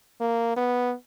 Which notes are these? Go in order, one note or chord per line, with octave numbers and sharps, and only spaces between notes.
A#3
B3